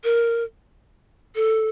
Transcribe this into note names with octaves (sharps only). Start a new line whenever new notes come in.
A#4
A4